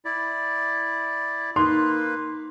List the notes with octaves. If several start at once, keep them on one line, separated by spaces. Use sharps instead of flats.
E4 D5
A#3 D#4 B4 C6